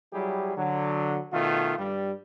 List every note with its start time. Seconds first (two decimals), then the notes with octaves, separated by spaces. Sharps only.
0.13 F#3 G3 E4 G4 G#4
0.57 D3 F#3
1.33 B2 D#3 A3 F4
1.78 G2 G3